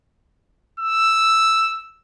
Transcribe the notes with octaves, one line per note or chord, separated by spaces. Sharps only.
E6